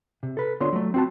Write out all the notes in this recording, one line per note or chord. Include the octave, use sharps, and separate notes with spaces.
C3
A4 B4
D3 B3 F4 C#5 C6
F#3 A3
C4 F#4 A5